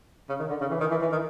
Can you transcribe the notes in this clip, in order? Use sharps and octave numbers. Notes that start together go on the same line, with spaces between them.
C#3
D#3
D3
C#3
E3
D#3
E3
E3
D#3